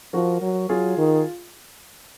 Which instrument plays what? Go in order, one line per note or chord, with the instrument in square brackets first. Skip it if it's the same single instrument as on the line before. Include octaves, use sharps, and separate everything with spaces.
[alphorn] F3 [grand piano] F#4 A#4
[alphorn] F#3
[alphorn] F#3 [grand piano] F4 G#4
[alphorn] D#3